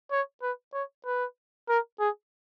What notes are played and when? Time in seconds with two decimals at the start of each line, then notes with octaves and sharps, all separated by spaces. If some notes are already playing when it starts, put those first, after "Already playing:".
0.11 C#5
0.42 B4
0.73 C#5
1.06 B4
1.69 A#4
2.00 G#4